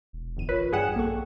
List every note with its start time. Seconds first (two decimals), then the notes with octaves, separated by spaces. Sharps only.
0.13 E1
0.37 G1 E2 D#7
0.49 A1 F4 A#4 B4 C#5
0.73 G2 G3 G#4 F#5 G5 E7
0.96 A#1 A#3 A4 C#6